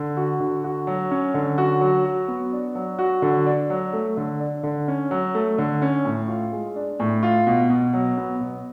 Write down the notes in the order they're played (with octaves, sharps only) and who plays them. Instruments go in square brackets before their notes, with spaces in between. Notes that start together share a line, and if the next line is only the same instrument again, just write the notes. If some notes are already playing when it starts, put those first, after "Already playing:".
Already playing: [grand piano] D3
F#4
D3
F#4
F#3
C#4
D3
F#4
F#3
F#4
B3
D4
F#3
F#4
D3
D4
F#3
A3
D3
D4
D3
C#4
F#3
A3
D3
C#4
A2
F4
G#3
D4
A2
F4
B2
B2
F#3
B3
B2